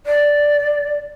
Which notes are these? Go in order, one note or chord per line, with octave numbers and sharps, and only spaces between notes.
D5